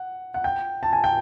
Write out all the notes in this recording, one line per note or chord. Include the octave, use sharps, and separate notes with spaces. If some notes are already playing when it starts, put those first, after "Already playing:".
Already playing: F#5
F#5
G5
A5
G#5
G5